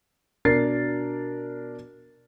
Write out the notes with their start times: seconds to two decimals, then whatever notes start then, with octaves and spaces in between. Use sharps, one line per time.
0.45 B2 D4 A#4 A6 C7